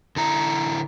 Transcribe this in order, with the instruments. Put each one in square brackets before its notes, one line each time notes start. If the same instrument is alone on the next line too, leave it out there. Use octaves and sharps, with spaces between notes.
[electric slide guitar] D3 E4 A#5